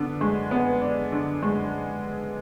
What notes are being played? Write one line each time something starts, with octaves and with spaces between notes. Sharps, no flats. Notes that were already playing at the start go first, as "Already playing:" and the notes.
Already playing: D3 B3 D4
G#3
B3
D4
D3
G#3